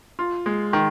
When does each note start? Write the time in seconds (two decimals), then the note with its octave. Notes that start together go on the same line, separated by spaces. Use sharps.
0.19 F4
0.46 G#3
0.73 D#3